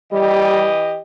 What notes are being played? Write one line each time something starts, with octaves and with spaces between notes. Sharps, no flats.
E3 G3 G4 D#5